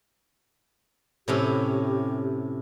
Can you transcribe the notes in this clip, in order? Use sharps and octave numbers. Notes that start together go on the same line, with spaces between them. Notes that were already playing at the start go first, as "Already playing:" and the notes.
A2 C3 C#4 G4